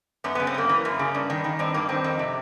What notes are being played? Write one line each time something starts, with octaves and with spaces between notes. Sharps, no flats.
F#2 B3
C#3 B3
C4
F#2 A#3
E3
F#2
C#3
G2
D#3
D#3
G2 C4
G2 A#3
D#3 C4
F2
C3